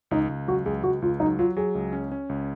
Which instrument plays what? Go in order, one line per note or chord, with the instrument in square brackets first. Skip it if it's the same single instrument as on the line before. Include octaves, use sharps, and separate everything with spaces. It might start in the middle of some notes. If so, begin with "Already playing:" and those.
[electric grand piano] C#2 [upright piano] D#4
[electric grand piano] C#2
[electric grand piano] F#3 [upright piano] F#4
[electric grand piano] C#2 [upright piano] G#4
[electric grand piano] C#2 [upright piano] F#4
[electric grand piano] C#2 [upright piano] F4
[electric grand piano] F#3 [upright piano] D#4
[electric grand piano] F#3 [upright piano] F4
[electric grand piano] F#3 [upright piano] G#4
[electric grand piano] C#2
C#4
C#4
C#2